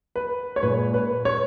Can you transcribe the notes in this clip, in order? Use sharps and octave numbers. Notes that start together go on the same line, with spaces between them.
B4
C#5
A#2 G#3 B4
B4
C#5